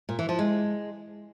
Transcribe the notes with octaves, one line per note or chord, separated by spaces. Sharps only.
A#2
E3
F3
G#3